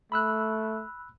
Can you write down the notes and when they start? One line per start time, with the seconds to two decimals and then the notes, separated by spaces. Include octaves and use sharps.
0.12 A3 B5 E6 F#6